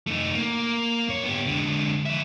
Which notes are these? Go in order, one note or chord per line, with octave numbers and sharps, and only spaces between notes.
A3 D#4
A#3
G2 C#5
B3 G4
D3 G#3
F3 E5